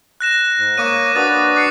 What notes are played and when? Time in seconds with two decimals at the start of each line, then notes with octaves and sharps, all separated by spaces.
0.20 F#6 A#6 E7
0.59 G#2
0.78 A#3 C#5 D6 D#6 D#7
1.15 D4 F#4 B4 D#6 A6
1.56 D6 C7 C#7